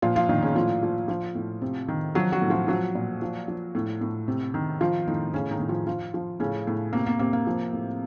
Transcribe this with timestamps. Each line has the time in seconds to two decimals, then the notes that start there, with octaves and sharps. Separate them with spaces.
0.02 A#2 F3 F4
0.16 F3 F4
0.29 A#2 D#3 D#4
0.42 C#3 C#4
0.55 A2 F3 F4
0.83 F3
1.08 F3 F4
1.35 A2
1.62 C3
1.88 D#3
2.15 F3 F#3 F#4
2.32 F#3 F#4
2.42 A2
2.50 F3 F4
2.68 F3 F#3 F#4
2.95 A#2
3.22 F3
3.48 F3
3.75 A2
4.01 A2
4.28 C3
4.54 D#3
4.81 F3 F4
5.07 A2 D#3 D#4
5.34 A2 C#3 C#4
5.51 D#3 D#4
5.60 A2
5.69 F3 F4
5.87 F3 F4
6.14 F3
6.40 A2 C#3 C#4
6.67 A2
6.93 C3 A#3
7.06 A#3
7.19 C3 A#3
7.33 A#3
7.47 F3
7.73 A2